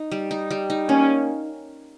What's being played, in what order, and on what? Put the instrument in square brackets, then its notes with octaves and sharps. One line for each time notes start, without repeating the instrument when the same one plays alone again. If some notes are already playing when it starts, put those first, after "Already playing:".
Already playing: [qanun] D#4
G3
D#4
G3
D#4
[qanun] A#3 [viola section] C#4